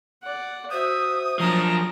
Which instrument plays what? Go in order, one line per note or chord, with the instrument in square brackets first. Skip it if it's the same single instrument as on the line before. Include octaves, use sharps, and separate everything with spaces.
[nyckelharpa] D5 F#5
[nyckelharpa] F#4 E5 [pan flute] C5 [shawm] D#6
[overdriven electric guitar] F3 D4 [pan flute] F#3 [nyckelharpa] A#5